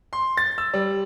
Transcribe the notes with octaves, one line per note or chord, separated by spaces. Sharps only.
C6
A6
E6
G3